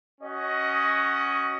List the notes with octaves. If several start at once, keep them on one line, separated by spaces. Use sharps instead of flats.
C#4 F#4 D#5 F#5